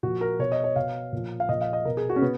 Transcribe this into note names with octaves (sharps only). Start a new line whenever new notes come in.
A#2 F3 F#4
A#4
B2 C#5
D#5
C#5
B2 F5
A#2 F3
F5
A#2 F3 D#5
F5
D#5
B2 A#4
G#4
F#4
C#4
B2 B3